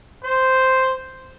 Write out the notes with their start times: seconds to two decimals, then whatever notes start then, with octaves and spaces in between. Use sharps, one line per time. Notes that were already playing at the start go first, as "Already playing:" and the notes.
0.24 C5